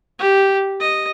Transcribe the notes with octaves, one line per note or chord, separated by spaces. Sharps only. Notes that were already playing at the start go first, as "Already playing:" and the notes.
G4
D#5